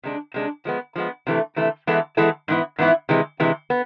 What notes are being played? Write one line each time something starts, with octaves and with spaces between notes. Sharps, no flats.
C3 G#3 D4
C3 G#3 D4
F3 G#3 B3
F3 G#3 B3
C3 E3 A3
C3 E3 A3
E3 G#3 B3 E4 A4
E3 G#3 B3 E4 A4
G#2 E3 B3 E4
G#2 E3 B3 E4
C3 E3 G#3
C3 E3 G#3
B3